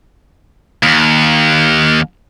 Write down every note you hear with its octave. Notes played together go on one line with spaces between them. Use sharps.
D#2